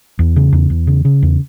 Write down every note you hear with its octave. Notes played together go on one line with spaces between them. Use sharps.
E2
C#3
E2
E2
C#3
C#3
E2